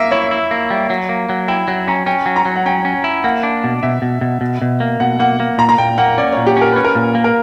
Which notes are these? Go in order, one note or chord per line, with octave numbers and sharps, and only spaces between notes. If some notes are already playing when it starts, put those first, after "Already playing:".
Already playing: A#3 E5
E4 C#5
E4
A#3
G3
F#3
A#3
F#3
E4 G5
F#3 G5
C#4 A#5
C#4 G5
F#3
A#5
F#3
F#5
C#4 G5
C#4
E4
A#3 F#5
D4
B2
B2 E5
B2
B2
B2
B2
A#3
B2 F#5
A#3 F#5
A#3
A#2 A#5
A#5
A#2 G5
A#3 F#5
C#4 D5
A#2 C#5
G4
C#4 A#4
C#4 B4
A#4
A#2
A#3
A#4